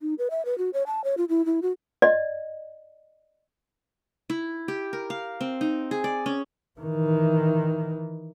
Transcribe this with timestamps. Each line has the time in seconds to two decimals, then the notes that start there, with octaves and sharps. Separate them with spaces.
0.01 D#4
0.18 B4
0.30 E5
0.45 B4
0.58 F#4
0.73 C#5
0.87 A5
1.04 C#5
1.17 F4
1.29 E4
1.45 E4
1.62 F#4
2.02 D5 D#5
4.30 E4
4.68 G4
4.93 A#4
5.10 F5
5.41 C4
5.61 D#4
5.91 G#4
6.04 D5
6.26 C#4
6.80 D#3 E3